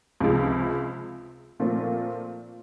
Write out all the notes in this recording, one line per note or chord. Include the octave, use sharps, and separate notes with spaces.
C#2 C3 F3 G#3
A#2 F3 A3 C4 F4